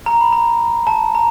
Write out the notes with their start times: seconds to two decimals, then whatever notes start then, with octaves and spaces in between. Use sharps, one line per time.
0.06 A#5
0.21 B5
0.32 A#5
0.87 A5
1.15 A#5